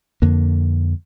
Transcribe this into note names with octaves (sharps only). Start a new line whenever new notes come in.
F2 D3 A#3